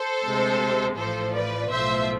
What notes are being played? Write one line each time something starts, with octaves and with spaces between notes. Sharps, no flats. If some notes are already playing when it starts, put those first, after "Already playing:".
Already playing: A4 C5
D2 C3 G#3
A1 A2 F3 A4 C5
B4 D5
B1 A2 F3 A3 C5 E5